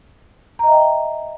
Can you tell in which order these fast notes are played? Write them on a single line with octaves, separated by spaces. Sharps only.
A#5 D#5 E5 G5